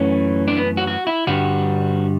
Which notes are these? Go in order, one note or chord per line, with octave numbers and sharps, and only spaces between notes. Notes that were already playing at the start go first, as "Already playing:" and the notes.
Already playing: F#2 E3 A3 C#4
D4
B3
F#4
F#4
E4
G2 D3 G3 F#4